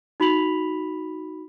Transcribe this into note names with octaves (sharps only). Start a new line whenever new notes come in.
D#4 F#4 B5 B6 F7 F#7